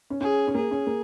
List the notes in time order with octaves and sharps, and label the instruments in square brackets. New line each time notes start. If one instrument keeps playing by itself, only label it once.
[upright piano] C#4
[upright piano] C#4 [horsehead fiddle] G#4
[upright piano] C#4
[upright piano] A#3 [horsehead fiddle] G#4
[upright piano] C#4
A#3